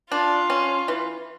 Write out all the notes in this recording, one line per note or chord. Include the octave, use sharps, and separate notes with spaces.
D4 F4
C#4
E3